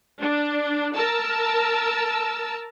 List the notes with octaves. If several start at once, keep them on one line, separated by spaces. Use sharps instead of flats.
D4
A#4 A5 E6